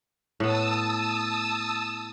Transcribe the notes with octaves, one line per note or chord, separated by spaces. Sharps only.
A2 B3 A5 D#6 E6